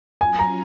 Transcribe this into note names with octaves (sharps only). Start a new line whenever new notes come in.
F#3 C#4 F4 G#5
A#5